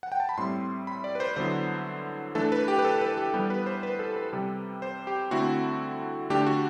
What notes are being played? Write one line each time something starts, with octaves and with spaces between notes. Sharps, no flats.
F#5
G5
A5
B5
A2 G3 C4 E4 C6
B5
D5
B4
C5
D3 F#3 B3 E4 C5
E3 A3 D4 A4
B4
G4
B4
A4
B4
G4
E3 G3 B3 G4
B4
C5
B4
A4
B4
C3 G3 C4
C5
G4
D3 A3 C4 E4 F#4
D3 A3 D4 G4
F#4